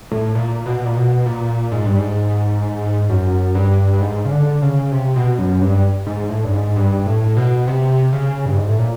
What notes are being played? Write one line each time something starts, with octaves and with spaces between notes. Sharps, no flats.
A2
A#2
B2
A#2
B2
A#2
G#2
G2
G#2
F#2
G2
G2
G#2
C#3
D3
C#3
C3
B2
F#2
G2
G#2
A2
G2
G#2
G2
A2
B2
C3
C#3
G2
G#2
A2
A#2